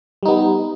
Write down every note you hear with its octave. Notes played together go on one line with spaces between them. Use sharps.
G3 B3 D#4